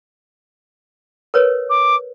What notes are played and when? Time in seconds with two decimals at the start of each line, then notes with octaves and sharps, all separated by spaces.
1.34 A#4 B4 C#5
1.70 D6